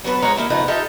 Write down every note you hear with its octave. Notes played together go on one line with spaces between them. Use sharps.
F#3 B3 A4 B4
G#2 G#3 F4 C#5 F#5 A#5
D#3 F3 A#3 E4
C#3 F3 A3 B3 D#4 B4
D#4 F4 G4 A4 E5